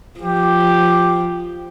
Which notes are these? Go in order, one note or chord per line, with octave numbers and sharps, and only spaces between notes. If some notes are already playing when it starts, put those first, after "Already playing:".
F3 G4